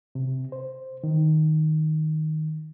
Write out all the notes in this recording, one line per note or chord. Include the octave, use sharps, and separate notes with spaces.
C3
C5
D#3